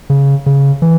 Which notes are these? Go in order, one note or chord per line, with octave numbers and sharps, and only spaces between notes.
C#3
C#3
E3